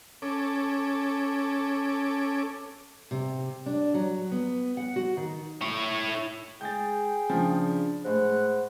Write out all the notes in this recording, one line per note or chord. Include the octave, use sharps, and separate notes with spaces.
C#4 A4 D6
C3
D4
F#3
B3
F#5
F#4
D#3
E4 C#5
G#3 G#4 G5 G6 A6
C#3 F3 D4
A2 G#3 C5 F#5 F#6